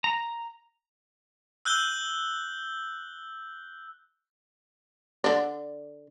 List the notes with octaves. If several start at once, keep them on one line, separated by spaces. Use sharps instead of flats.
A#5
E6 F#6 G6 G7
D3 D4